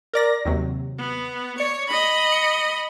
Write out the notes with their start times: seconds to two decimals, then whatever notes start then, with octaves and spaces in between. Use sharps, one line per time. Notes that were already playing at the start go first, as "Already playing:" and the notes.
0.13 A#4 D5 A#6
0.45 D#2 C3 F#3
0.98 B3
1.58 C#5 D5 C#7
1.87 D#5 B5
2.32 C#7